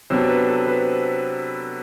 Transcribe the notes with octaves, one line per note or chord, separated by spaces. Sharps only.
C3 F#3 B3 D4 C5
B4
A4
B4